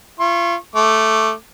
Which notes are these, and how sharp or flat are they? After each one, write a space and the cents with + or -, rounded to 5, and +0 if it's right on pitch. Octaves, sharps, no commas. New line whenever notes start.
F4 -35 C#6 -35
A3 +0 D6 +0